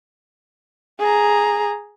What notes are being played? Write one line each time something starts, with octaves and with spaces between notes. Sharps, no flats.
G#4 A#5